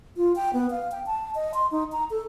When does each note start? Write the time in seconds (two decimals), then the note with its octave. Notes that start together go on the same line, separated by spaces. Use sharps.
0.17 F4
0.36 G5
0.53 B3
0.71 F5
0.92 G5
1.06 A5
1.35 D#5
1.54 C6
1.72 D#4
1.92 A#5
2.11 A4